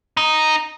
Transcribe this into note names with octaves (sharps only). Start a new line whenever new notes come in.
D#4